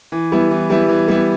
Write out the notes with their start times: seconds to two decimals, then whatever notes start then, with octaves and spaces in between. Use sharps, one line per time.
0.12 E3
0.32 G3 B3 E4
0.51 E3
0.70 G3 B3 E4
0.89 E3
1.08 G3 B3 E4